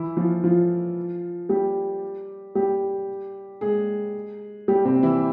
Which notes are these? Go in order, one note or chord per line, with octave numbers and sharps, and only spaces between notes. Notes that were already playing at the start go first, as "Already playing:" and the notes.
Already playing: E3 E4
F3 F4
F3 F4
G3 G4
G3 G4
G#3 G#4
G3 G4
C3 C4
E3 E4